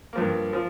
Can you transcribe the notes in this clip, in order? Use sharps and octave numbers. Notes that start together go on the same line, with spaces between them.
G2 F3 A#3
F3